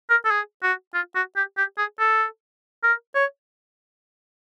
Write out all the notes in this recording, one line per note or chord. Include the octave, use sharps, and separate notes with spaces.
A#4
A4
G#4
F#4
F4
F#4
G4
G4
G#4
A4
A#4
C#5